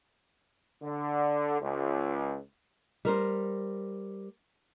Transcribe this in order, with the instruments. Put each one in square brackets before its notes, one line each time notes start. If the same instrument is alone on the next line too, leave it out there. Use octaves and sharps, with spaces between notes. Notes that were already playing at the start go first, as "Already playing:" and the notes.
[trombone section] D3
C#2
[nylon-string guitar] G3 A#4 C5